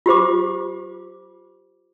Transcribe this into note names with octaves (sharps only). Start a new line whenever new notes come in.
F4 G4 C5 D6